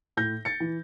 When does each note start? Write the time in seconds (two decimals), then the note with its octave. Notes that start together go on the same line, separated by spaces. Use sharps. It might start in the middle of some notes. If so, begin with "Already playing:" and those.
0.17 A2 G6 A#6
0.45 A6 C#7
0.60 E3